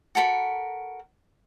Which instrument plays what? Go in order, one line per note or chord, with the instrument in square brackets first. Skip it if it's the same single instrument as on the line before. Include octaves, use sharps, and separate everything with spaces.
[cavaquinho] F#4 A4 A#4 B5